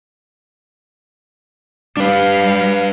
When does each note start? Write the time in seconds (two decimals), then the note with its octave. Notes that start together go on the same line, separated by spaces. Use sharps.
1.97 G3 D4 B4 F5